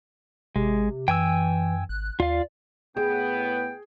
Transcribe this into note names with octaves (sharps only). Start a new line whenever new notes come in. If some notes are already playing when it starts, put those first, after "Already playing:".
G#1 C3 G#3
F#2 E3 G5 G#5 E6
G#1 F#6
D#2 F4 D5 F5
A2 B3 G#4 G5